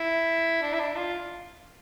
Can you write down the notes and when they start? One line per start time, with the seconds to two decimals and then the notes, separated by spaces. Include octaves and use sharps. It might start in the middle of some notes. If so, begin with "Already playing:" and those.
Already playing: E4
0.62 D4
0.74 E4
0.80 D4
0.97 F4